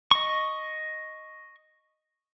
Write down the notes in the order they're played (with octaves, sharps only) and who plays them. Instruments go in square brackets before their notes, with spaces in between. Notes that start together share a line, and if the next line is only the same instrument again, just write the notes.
[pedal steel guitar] D#5 C#6